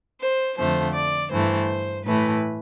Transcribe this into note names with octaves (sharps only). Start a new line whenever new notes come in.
C5
F2 D3 F3 A3 C5
D5
G2 E3 A3 C5
A2 E3 A3 B4